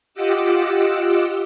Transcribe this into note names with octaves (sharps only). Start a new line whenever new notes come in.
F4 G4 D#5 F#5 D6 E6